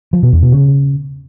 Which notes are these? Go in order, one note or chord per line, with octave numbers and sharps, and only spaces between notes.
F3
B2
E2
B2
C#3